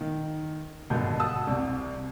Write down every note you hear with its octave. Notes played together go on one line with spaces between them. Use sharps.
D#3
G#1 G2 B2 D3 G6
F#5 A5 D#6 E6
C2 C3